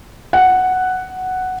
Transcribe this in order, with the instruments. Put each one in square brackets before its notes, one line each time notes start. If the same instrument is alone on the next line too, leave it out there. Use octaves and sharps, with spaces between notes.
[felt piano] F#5